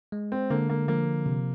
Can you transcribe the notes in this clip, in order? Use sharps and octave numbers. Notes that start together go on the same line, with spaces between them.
G#3
C4
D3 A#3
A#3
F3 A#3
C3